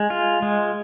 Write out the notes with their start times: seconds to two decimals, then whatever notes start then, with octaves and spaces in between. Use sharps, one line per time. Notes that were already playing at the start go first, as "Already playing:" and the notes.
Already playing: G#3
0.10 F4
0.42 G#3